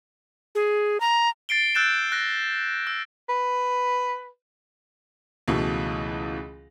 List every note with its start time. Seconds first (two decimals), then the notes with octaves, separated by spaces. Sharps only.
0.55 G#4
1.00 A#5
1.49 A6 C7 D7 G7
1.75 E6 F#6 G6 A6 E7
2.12 F#6 A#6
2.87 E6
3.29 B4
5.48 C#2 B2 E3 A3